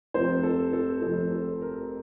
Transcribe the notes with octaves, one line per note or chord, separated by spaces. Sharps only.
F1 F2 C3 F3 C5
A4
A4
F1 F2 C3 F3 A4
A4
A#4